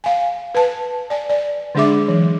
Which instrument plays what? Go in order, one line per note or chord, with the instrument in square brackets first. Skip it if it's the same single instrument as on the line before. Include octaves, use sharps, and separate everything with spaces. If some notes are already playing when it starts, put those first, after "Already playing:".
[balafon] F5 G#5
B4 A5
D5 G#5
D5
D3 G#3 D4 G#4 E5 D6
E3 F#3